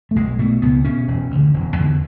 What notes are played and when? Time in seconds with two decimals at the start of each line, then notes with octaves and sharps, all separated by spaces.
0.11 A3
0.16 B1 G#3
0.39 B2 A3
0.62 C#2 B3
0.84 B2 C#4
1.08 E1
1.31 D2 D3
1.53 E1
1.76 E2 D3